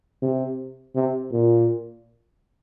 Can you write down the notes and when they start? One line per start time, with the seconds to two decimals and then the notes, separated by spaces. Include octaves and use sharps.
0.22 C3
0.95 C3
1.32 A#2